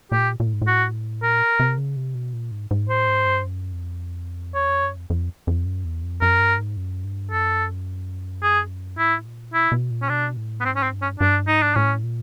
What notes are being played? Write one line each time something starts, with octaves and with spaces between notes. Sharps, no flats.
A#2 G4
A#2
A2
G#2
A2
F#4
A#2 A#4
C3
C#3
C3
B2
A#2
G#2
G#2
A2 C5
G#2
G2
F#2
F2
E2 C#5
F2
F#2
F2
F2
F2
F#2
E2
F2
F#2 A#4
G2
G#2
F#2
G2
F#2 A4
G#4
A2 E4
A#2
B2 E4
B2
A#2
C#4
B2 D4
A2
B3
G#2 C4
C#4
C4
G2
C#4
G2 D4
G#2 D#4
D4
A2 C#4
A#2